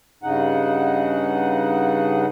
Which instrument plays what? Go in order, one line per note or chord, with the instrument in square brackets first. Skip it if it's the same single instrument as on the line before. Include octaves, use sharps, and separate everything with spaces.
[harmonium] G2 C#3 D#4 F#5